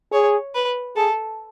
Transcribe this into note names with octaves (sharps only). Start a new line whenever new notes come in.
G#4 C#5
B4
G#4 A4